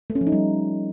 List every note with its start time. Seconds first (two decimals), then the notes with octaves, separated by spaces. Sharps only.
0.10 A3
0.15 C#4
0.21 F3
0.27 D#4
0.32 G3